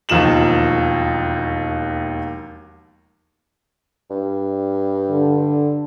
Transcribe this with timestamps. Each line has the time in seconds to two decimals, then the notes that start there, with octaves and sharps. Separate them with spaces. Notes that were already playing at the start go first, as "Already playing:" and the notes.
0.09 E1 D#2 F3 D#4 E7 F#7
4.10 G2
5.10 D3